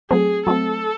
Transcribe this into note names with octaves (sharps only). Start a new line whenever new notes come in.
F#3 A3 C4 G#4
F#3 A3 C4 A4